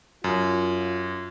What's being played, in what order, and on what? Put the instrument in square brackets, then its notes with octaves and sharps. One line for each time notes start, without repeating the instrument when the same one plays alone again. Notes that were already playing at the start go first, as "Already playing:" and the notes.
[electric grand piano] F#2 [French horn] F4